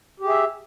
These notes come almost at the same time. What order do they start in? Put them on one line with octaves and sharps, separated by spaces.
G4 G#4 E5